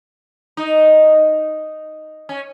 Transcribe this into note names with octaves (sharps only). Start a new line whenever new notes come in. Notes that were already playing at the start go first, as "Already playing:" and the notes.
D#4
C#4